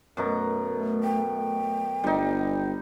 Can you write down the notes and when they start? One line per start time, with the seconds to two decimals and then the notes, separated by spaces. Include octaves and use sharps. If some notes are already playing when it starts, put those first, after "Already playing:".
0.17 F#2 B2 A3 A#5
1.04 G5
2.04 G1 G3 D#4